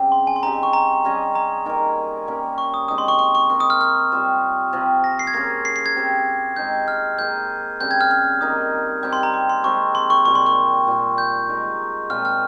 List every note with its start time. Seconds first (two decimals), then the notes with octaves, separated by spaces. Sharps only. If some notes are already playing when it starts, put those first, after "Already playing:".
Already playing: C#3 G3 C4 G4
0.12 C6
0.27 G#5
0.36 C6
0.43 C4 D#4 G4 A#5
0.53 C6
0.63 C#6
0.73 A#5
1.05 G3 C#4 G#4 D#5
1.35 A#5
1.65 D#3 A#3 D#4 A#4
2.27 G3 A#3 C#4
2.58 C#6
2.74 D#6
2.88 G#3 C4 D#4 D#6
2.98 C6
3.08 C#6
3.19 C#6
3.35 C#6
3.50 C4 D#4 A#4 C#6
3.60 D#6
3.70 F6
3.81 F6
4.12 G3 C4 F4 C5
4.73 C3 F3 C4
5.04 A#6
5.19 C7
5.27 G#6
5.34 A#3 C#4 G#4 A#6
5.65 C7
5.76 C7
5.86 G#6
5.96 C4 G4 C5
6.56 G#3 C4 D#4 G6
6.88 F6
7.18 A#3 D#4 G#4 C5 G6
7.80 C#3 G3 C4 G6
7.91 G#6
8.01 F6
8.11 F6
8.41 D#3 A#3 D#4 D#6
9.03 G3 C4 G4 G6
9.13 C6
9.23 A#5
9.34 C6
9.49 C6
9.64 G#3 C4 G4 C#6
9.95 C6
10.10 C#6
10.25 A#2 G3 C4 C#6
10.35 C6
10.46 C#6
10.87 A#2 G3 C4
11.18 G6
11.49 G#3 D#4 A#4
12.10 A#2 F3 G#3 C4 F6
12.25 F6